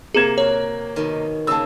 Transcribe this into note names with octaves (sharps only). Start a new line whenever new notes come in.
C3 A#3 G#4 G#6 E7
F#4 A#4 C#5
B2 D#3
C#3 A#3 A5 E6